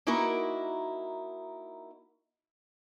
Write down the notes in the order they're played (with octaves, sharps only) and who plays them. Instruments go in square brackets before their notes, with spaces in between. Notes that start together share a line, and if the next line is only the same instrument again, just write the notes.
[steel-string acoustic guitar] A#3 D#4 E4 F#4 A#4